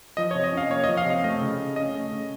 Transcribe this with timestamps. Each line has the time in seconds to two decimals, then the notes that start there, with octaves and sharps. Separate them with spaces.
0.17 F3 D#5
0.31 C3 C#5
0.44 D#5
0.53 C#4 F5
0.70 A#3 C#5
0.84 F3 D#5
0.97 F5
1.05 C3
1.10 F5
1.24 A3 D#5
1.41 C#3
1.59 C#3
1.76 C#4 D#5
1.94 A3
2.12 C#3